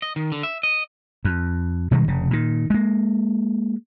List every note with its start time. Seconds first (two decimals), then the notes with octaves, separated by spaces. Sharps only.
0.02 D#5
0.16 D#3
0.32 D3
0.43 E5
0.63 D#5
1.25 F2
1.91 B2 D#3 G3 G#3
2.08 F1 C#3
2.31 A#2 D#3
2.70 G#3 A#3